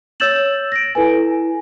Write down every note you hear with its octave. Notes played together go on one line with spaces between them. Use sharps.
C#5 E6 G6 A6 E7 F#7
A#6 D7
E4 A4 B4 G#5